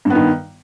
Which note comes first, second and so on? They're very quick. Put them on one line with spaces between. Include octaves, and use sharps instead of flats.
G2 B3 D#3